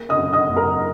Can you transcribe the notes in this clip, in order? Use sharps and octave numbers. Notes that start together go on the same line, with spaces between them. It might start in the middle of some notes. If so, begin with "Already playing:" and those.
Already playing: A#3
D#5 D#6
F#2
D#5 D#6
F#1
A#4 A#5